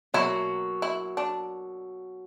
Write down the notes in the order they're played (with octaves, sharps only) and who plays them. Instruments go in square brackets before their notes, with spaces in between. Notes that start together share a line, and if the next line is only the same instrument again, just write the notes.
[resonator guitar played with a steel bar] B2 F#3 A#3 [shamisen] E4
[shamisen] E4
D4